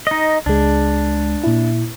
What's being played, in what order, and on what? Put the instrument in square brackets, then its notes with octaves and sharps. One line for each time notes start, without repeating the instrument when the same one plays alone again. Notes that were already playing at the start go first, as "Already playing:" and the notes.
[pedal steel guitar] D#4 D#5
[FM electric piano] C#2 G#3 [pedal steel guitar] D4
[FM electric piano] A#2 E4